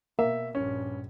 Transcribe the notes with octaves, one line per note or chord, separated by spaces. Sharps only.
B2 A#3 E5
A#1 G2 C#4